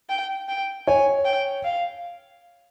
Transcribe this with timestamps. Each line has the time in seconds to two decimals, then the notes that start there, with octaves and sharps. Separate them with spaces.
0.09 G5
0.49 G5
0.87 C#5 G#5
1.25 G5
1.64 F5